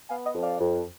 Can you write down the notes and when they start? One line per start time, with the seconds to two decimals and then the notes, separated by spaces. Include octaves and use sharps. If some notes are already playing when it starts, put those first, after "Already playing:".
0.09 B3 F5 G#5
0.26 D#5 F#5
0.35 F2
0.43 D5 F5
0.60 F2